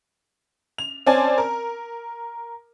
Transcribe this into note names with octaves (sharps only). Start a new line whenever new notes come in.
F7
C4 C#4 D5 G#5 A5
A#4